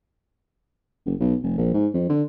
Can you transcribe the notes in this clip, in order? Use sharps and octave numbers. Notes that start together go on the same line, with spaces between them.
F#1
B1
F1
A#1
G#2
F2
D3